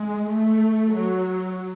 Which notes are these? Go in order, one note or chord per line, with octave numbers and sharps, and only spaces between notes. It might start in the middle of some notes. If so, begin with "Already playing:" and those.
Already playing: G#3
A3
F#3